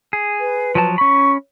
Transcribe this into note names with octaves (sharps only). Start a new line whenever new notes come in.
G#4
B4
F3 F#3 A5
C#4 B5 C#6